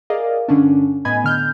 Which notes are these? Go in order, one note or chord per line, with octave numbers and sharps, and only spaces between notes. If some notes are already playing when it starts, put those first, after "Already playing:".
G#4 A#4 D5 D#5 F5
G2 D3 C#4 D4
A2 B3 D#5 G#5 B5 G#6
D3 F6 G6